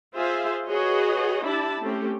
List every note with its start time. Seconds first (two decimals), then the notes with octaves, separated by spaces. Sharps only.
0.13 F4 G#4 C5 E5 F5
0.67 F#4 G#4 B4 C#5 D#5
1.44 D4 E4 G4 A5 B5
1.80 A3 C4 C#4 G4